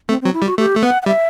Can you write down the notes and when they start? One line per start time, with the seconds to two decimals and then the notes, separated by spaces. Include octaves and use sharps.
0.09 A3 C4
0.22 C4
0.25 F#3
0.34 E4
0.42 G3
0.46 F#4
0.58 A3 G4
0.75 A3
0.82 B3 F#5
1.02 F#5
1.06 G3 E5